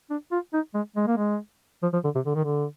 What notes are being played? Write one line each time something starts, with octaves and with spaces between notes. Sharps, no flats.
D4
F4
D#4
G#3
G#3
A#3
G#3
F3
F3
D3
C3
D3
D#3
D3